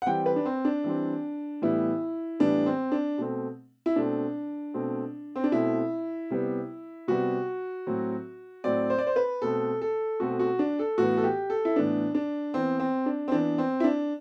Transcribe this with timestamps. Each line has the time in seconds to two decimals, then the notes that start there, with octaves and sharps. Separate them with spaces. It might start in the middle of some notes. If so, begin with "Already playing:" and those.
0.02 F#5
0.06 E3 G3 C4 G5
0.26 B4
0.36 D4
0.45 C4
0.65 D4
0.84 E3 G3 C4
1.62 A2 E3 G3 B3 E4
2.39 A2 E3 G3 B3 D4
2.66 C4
2.92 D4
3.18 B2 A3 C4
3.86 E4
3.96 B2 A3 C4 D4
4.74 B2 A3 C4
5.36 C4
5.44 D4
5.52 B2 A3 C4 E4
6.30 C3 G3 B3
7.08 C3 G3 B3 F#4
7.87 A2 F#3 C4
8.64 A2 F#3 C4 D5
8.90 C5
8.98 D5
9.07 C5
9.16 B4
9.42 B2 A3 C4 A4
9.82 A4
10.20 B2 A3 C4 F#4
10.39 F#4
10.59 D4
10.79 A4
10.98 A2 E3 B3 F#4
11.17 A4
11.24 G4
11.50 A4
11.65 E4
11.76 A2 E3 B3 D4
12.15 D4
12.54 E3 B3 C4
12.79 C4
13.06 D4
13.28 C4
13.32 E3 B3 D4
13.58 C4
13.80 E4
13.84 D4